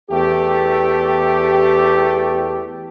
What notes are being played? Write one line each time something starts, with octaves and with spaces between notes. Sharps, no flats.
E2 A3 G4